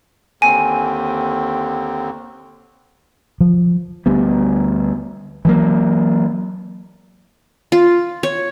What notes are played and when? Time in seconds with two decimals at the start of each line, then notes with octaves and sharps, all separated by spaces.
0.42 D#2 D3 C4 G#5
3.41 F3
4.06 D2 G3 B3
5.45 E3 F#3 A#3
7.72 F4
8.23 C#5